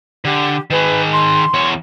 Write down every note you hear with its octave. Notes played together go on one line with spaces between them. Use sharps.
D3 G4
D#3 G#4 B4
C6
E2 C#5